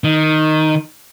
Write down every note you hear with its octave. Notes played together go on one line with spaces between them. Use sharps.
D#3